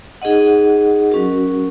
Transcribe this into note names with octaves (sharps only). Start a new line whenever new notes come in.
D#4 G#4 D#5 F#5
F#3 C#4 F#4 A#4